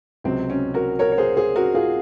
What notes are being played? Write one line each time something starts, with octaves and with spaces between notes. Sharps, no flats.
C#2 C3 F#3 C4
C#4
F#4 A#4
A#4 C#5
C#5
G#4 C5
G#4 C5
F#4 A#4
F4 G#4